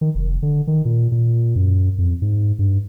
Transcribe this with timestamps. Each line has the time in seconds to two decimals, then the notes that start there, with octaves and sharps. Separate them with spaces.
0.01 D#3
0.15 F1
0.42 D3
0.67 D#3
0.85 A#2
1.12 A#2
1.56 F#2
1.98 F2
2.22 G#2
2.59 G2